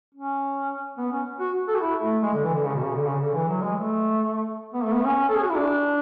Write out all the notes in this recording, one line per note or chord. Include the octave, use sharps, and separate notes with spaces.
C#4
B3
C#4
F#4
A4
F#4
E4
A3
G#3
D3
E3
D3
C#3
B2
C#3
D3
C#3
D3
E3
F#3
G#3
A3
B3
A3
B3
C#4
A4
G#4
F#4
E4
D4